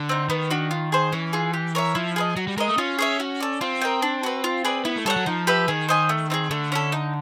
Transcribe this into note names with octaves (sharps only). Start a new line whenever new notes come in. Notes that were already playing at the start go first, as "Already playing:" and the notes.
Already playing: D3
C4 D#4
D#3 B3
D4 F#4
F4
G#4 C5
E3 C#4
F4 G#4
G4
A#4 C#5 E5
F3 E4
G#4 B4 D#5
F#3 F#4
G3
G#3 A#4 D#5
A3
C#4 F4
G#4 C#5 E5
F#4
A4 D5
C4 F4
A#4 D#5 G5
D4
F#4 B4
F4
G#4 B4 D5
B3 E4
A3
G3 A4 C#5 F#5
F#3
F3 D#4
G4 B4 E5
D#3 G#4
C5 D#5 G#5
A3
C4 D#4 G#4
D3 A3
C#4 E4 A4
D#4